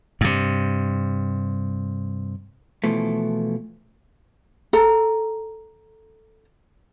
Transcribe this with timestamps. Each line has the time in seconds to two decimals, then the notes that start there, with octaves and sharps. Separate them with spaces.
0.21 G2 C3
2.84 B2 E3 F3 A3
4.73 A4 A#5